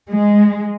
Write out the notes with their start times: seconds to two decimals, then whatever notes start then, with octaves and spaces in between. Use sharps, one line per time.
0.10 G#3